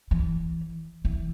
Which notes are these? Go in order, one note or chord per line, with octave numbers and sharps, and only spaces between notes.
E3
E3